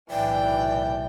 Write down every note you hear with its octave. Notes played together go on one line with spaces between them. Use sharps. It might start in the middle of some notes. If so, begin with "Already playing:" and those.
B1 A2 C3 E3 D5 G5